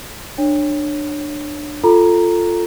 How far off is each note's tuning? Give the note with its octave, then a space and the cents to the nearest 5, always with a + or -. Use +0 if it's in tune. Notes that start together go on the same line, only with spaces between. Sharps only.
D4 +20 C#5 -5
F4 +0 A4 +5 A#5 +0